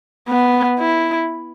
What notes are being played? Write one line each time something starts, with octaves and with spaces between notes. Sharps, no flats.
B3
E4